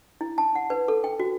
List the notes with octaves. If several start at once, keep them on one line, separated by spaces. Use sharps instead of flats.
E4
A5
F#5
B4
A4
G5
F#4